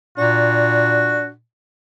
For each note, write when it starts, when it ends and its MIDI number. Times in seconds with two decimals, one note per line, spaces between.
0.18 1.42 46
0.18 1.30 62
0.18 1.24 66